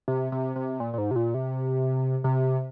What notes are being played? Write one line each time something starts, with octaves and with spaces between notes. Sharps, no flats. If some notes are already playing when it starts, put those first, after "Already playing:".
C3
C3
C3
A#2
A#2
G#2
C3
A#2
C3
C3